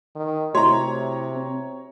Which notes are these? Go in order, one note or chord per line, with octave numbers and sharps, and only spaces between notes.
D#3
C3 A3 E4 F#4 C#5 A#5
C4